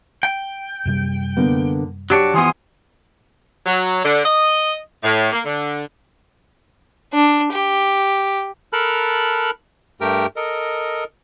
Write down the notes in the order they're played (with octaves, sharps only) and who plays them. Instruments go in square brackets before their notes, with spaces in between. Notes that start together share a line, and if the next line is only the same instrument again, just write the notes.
[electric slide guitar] G5
[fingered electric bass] F#2 C3 G3
[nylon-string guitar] D3 A#3 B3
[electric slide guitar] F#3 D4 C#5 [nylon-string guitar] G4
[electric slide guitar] E3 F3 B3 [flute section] G#5 C6 D#6
[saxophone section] F#3
D3
D#5
A2
A#3
D3
[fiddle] D4
G4
[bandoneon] A4 A#4 A5 B5 F6 F#6
G2 A3 G4 A#4 G5
A4 A#4 D#5